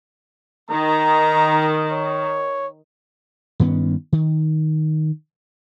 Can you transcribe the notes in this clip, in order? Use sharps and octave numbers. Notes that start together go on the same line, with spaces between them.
D#3 A#5
C#5
G2 D#3 B3 C#4
D#3